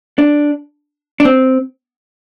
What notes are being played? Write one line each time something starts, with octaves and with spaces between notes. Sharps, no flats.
D4
D4
C4